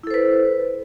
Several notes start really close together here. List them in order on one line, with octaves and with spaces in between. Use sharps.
E4 A4 C5 B4